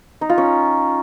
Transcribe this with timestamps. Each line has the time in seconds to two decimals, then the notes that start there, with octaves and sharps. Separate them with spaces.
0.21 D#4
0.30 F4
0.38 C#4